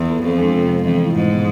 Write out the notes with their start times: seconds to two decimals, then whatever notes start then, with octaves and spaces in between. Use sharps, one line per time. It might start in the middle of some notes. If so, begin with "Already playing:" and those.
Already playing: E2
0.09 B3 F4 A4
0.24 F2 F3
0.38 G#3 D4
0.54 C3
0.69 F3 G#3 B3
0.84 F2 E3
0.99 A3 E4
1.15 G#2 B2
1.30 B3 F4 G#4